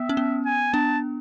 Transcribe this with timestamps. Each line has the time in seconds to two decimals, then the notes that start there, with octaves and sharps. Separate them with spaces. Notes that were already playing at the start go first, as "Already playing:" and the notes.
Already playing: B3 E5
0.09 C#4
0.17 B3
0.46 G#5
0.73 B3 D4 A5